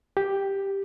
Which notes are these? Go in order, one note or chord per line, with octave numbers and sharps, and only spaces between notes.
G4